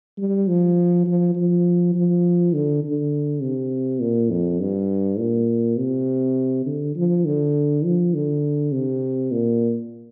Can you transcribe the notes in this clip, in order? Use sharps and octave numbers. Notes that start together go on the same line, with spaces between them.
G3
F3
F3
F3
F3
D3
D3
C3
A#2
F2
G2
A#2
C3
D3
F3
D3
F3
D3
C3
A#2